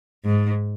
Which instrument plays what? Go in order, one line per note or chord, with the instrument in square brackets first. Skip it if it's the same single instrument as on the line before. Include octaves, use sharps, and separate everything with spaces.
[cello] G#2